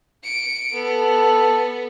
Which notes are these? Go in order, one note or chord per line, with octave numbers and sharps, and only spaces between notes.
C#7 D7
B3 A4